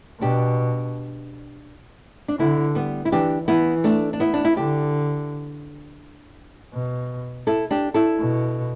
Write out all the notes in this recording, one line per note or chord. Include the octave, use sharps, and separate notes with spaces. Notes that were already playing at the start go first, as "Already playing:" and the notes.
B2 D4 G4
D4
D3 B3 E4
G3 B3
E4
E3 D4 G4
E3 B3 E4
A3 D4
D4
B3 E4
D4
E4
D3 D4 G4
B2
E4 A4
D4 G4
E4 A4
B2